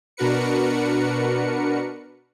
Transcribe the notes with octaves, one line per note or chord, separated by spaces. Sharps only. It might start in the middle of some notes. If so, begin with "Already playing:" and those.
B2 D4 F#4 A#4 B4 C#7